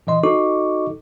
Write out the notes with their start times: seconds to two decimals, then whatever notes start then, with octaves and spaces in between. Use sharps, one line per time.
0.07 A#2 E3 D#5 C6
0.23 D#4 F#4 A4 D#5 C#6 D6